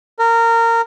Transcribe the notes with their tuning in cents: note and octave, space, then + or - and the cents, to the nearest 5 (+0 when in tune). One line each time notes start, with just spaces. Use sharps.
A#4 -20